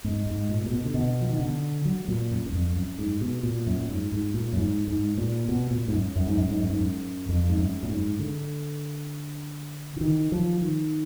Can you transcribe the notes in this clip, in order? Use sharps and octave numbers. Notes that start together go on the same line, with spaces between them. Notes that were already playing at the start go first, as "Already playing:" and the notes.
G#2
G#2
A#2
A#2
B2
D3
B2
F3
D#3
D3
F#3
A#2
F#2
F#2
F2
F#2
G#2
B2
A#2
F#2
A#2
G#2
G#2
A#2
F#2
G#2
G#2
A#2
B2
A#2
G#2
F#2
F#2
G#2
F#2
G#2
F#2
G#2
F#2
F2
G#2
F#2
A#2
G#2
D3
D3
D#3
F3
D#3